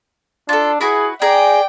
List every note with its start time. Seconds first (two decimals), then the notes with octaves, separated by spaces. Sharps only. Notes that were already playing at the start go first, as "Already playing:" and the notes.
0.49 D4 F4 A4
0.81 E4 F#4 G#4 B4
1.22 G#4 D5 G5 G#5 A#5